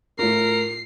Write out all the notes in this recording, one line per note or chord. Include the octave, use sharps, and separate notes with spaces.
A2 F4 A#4 C7